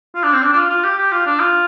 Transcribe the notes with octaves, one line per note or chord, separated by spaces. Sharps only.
F4
D4
C4
D4
D4
F4
F4
G4
G4
F4
D4
F4